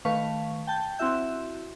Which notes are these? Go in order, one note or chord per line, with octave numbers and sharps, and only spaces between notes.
D#3 A3 B4 F5 C#6
G5 A5 G6
C4 E4 F#4 E5 G6